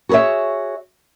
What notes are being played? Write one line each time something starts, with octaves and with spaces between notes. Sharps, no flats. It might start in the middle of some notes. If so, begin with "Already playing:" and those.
F#4 G#4 A#4 C#5 E5